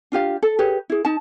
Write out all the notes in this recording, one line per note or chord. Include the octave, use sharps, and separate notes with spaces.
D4 F4 G4 F5
A4
G4 G#4 B4 C#5
E4 G#4
D#4 A5